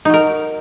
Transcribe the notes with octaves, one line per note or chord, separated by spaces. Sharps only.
F#3 D#4 A#4